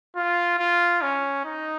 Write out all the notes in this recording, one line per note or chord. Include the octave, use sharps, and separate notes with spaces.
F4
F4
C#4
D#4